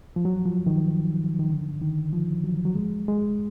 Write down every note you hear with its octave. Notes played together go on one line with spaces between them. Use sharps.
F3
F#3
F3
D#3
D#3
D3
D#3
F3
F#3
F#3
G#3
G#3